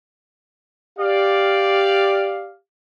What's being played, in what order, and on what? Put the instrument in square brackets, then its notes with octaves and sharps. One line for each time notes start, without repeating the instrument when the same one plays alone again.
[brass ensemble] G4 D5 F5